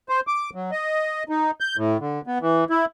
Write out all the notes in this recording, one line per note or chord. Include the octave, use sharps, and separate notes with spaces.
C5
D6
F#3
D#5
D#4
G6
A2
D3
B3
E3
E4